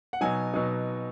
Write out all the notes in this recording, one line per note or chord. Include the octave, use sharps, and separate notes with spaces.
F#5
B2 F#3 D#4 G#5
B2 F#3 D#4